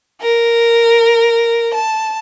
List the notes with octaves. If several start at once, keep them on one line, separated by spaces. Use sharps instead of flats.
A#4
A5